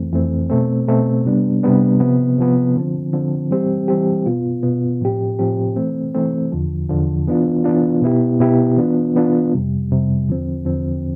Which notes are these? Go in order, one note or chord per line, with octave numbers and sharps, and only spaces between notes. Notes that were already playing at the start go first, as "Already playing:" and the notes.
Already playing: F2 E3 A3 C4
F2 E3 A3 C4
B2 A3 C4
B2 A3 C4
C3 G3 B3 D4
C3 G3 B3 D4
C3 F3 B3
C3 F3 B3
D3 F3 C4
D3 F3 C4
E3 G3 C4 G4
E3 G3 C4 G4
B2 B3 F4
B2 B3 F4
A2 F3 C4 G4
A2 F3 C4 G4
E3 A3 C4
E3 A3 C4
E2 D3 F3
E2 D3 F3
E3 B3 D4 F4
E3 B3 D4 F4
B2 B3 E4 G4
B2 B3 E4 G4
E3 B3 D4 F4
E3 B3 D4 F4
F2 C3 G3
F2 C3 G3
E2 D3 F3 C4
E2 D3 F3 C4